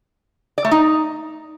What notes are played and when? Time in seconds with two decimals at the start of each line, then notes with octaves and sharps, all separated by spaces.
0.58 D5
0.65 A3
0.71 D#4